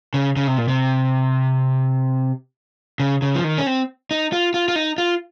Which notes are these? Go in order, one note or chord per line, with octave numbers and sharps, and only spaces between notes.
C#3
C#3
C3
A#2
C3
C#3
C#3
F3
D#3
C#4
C4
D#4
F4
F4
F4
D#4
F4